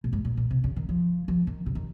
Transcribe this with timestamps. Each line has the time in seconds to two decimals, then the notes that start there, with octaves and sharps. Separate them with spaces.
0.04 A#2
0.13 G#2
0.25 A#2
0.37 A#2
0.50 C3
0.64 C#3
0.76 D#3
0.89 F3
1.28 F3
1.47 D#3
1.66 C#3
1.75 D#3